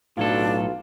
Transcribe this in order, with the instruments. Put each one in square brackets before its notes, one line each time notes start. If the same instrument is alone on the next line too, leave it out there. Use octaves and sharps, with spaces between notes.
[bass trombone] B1 [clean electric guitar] A2 F#3 A4 [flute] D4 [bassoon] F4